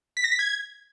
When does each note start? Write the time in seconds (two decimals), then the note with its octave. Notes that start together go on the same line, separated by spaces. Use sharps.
0.17 B6
0.24 A#6
0.32 B6
0.39 G#6